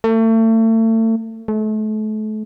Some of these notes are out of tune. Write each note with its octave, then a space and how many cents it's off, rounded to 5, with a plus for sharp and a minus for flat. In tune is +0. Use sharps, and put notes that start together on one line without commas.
A3 +35
A3 -35